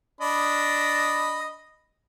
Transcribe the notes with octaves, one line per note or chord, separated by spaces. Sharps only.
D4 D#5 B5